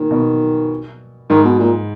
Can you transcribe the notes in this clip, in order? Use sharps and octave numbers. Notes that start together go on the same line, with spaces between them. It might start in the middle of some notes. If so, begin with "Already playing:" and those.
Already playing: A#2 D#3
B2
G#2 D#3
B2
A#2